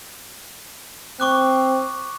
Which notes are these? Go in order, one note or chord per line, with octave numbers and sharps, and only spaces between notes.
C4 C#6 D6 F#6